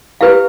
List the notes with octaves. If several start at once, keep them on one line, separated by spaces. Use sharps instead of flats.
E4 G4 B4 F5